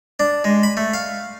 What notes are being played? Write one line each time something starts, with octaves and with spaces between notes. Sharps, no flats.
D4
G#3
B5
A3
F5